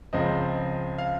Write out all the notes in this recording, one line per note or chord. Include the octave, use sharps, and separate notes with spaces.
C#2 C#3 F3 C4 D#5
F5